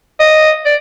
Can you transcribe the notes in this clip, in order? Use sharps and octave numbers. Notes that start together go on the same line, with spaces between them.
D#5
D5